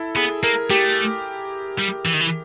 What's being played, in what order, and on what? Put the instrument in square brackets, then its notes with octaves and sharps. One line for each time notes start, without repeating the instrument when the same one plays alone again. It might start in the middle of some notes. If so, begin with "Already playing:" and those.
Already playing: [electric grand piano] E4 A4
[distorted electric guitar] B3 [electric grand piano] G#4
[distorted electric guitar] A#3 [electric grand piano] A#4
[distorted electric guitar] A3 [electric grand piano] G4
[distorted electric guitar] G3
E3
D#3
E3